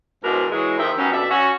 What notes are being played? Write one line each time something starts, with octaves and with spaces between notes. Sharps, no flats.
G#2 B2 F3 D4 E4 A#4
E3 F#3 G#3
D#2 D#3 F3 G4 A#4 E5
F#3 G3 B3 C#4
F2 B2 D4 E5
C#4 F#4